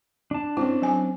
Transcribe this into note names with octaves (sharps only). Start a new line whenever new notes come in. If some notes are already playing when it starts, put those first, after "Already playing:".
D4 A5
C4 C#4 E4
F#3 G#5